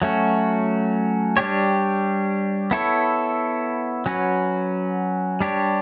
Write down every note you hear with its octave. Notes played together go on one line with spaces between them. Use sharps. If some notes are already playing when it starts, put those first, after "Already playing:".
F#3 A3 C#4 F#4
G3 D4 G4 C#5
B3 E4 A4 C#5
F#3 C#4 F#4 B4
G3 D4 G4 C#5